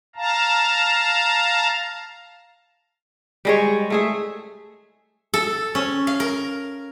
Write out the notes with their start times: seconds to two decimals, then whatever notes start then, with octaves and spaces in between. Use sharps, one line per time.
0.16 F5 A5 A#5
3.45 G3 G#3 C#5
3.90 A3 G#4 E5
5.34 A4
5.75 C#4
6.07 F5
6.20 A#4